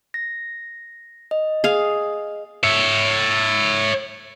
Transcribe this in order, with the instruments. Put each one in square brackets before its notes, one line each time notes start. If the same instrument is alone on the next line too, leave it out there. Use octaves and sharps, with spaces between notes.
[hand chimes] A#6
D#5
[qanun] G#4 F5
[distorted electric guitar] C#5 E5